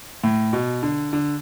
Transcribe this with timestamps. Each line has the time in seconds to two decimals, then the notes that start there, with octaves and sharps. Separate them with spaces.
0.24 A2
0.53 B2
0.83 D3
1.13 D3